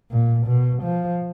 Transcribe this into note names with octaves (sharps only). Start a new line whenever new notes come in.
A#2
B2
F3